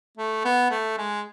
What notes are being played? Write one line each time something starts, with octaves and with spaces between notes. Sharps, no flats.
A3
B3
A3
G#3